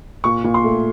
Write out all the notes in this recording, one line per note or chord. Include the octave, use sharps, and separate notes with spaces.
A#2 C#6
A#2
C6
A3